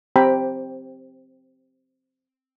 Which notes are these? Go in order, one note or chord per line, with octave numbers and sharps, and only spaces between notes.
C4 G4 G5 A#5 B5